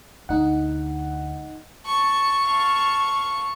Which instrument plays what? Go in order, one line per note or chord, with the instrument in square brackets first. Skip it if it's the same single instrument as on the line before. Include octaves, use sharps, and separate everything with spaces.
[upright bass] D2 [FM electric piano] D#4 F#5
[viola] A5 [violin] C#6
[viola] F5 A5